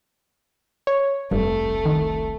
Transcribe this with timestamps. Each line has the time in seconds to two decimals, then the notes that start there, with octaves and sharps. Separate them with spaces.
0.87 C#5
1.31 F1 C2 G2 A3
1.85 D#3